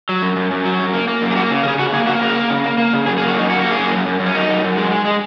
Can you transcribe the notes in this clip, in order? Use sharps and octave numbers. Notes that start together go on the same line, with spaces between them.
F#3
F#2
F#2
F#2
F#3
F#2
A#3
A#3
F#2
G#4
A#3 F#4
C#3
C#3 G#4 A#4
C#3 F#4
A#3 G#4
A#3 F#4
C#3 A#4
A#3
C#3
A#3
A#3
C#3
F#2 G#4
G#4
A#3
F#4
F#2 D#4
A#3 F#4
A#3 F#4
G#4
F#2
F#2
F#2
F#2
C#4
F#2 D#4
F#2
F#2
G#3
G#3
G#3